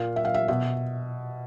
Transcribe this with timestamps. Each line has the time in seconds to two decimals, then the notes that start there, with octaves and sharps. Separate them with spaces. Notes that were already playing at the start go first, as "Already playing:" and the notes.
Already playing: A#2 F5
0.16 E5
0.25 F5
0.34 E5
0.48 B2 E5